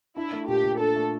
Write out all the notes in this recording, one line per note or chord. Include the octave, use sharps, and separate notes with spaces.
D4 E4
A3
A#2 G4
A#2
D4 A4
A3